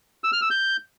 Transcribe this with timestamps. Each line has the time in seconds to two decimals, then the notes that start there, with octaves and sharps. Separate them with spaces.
0.24 E6
0.33 F6
0.42 E6
0.50 G6